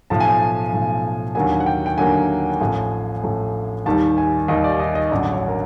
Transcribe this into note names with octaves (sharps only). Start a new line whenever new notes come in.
B1 A2 F3 A5
G#5
A5
B1 A2 F3
D#2 D3 F#3 A#3 G#5
F#5
G5
G5
D#2 D3 F#3 A#3 G#5
A1 A2 F3
A1 A2 F3
D#2 D#3 G3 A5
G#5
D#2 D#3 G3 D#5
D5
D#5
D#5
A1 G2 D3 F#3 D5
C#5
A#4